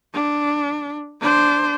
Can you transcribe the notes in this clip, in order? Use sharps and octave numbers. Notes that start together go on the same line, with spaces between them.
D4
D4 C5